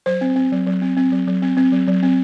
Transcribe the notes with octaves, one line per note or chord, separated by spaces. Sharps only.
F#3 C5
C4
C4
F#3
F#3
C4
C4
F#3
F#3
C4
C4
F#3
F#3
C4